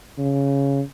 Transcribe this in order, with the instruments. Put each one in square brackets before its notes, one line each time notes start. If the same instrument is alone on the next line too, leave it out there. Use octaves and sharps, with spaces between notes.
[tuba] C#3